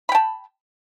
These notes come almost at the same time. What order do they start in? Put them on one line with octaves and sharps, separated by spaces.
B5 G5 A5